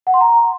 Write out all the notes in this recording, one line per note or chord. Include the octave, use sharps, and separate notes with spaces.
F#5
C6
A#5